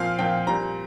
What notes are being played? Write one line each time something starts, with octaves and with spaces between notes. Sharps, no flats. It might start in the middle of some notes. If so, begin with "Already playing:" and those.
Already playing: A#2 F3 C4 F5
A#2 F3 C4 G5
A#2 G3 C4 A#5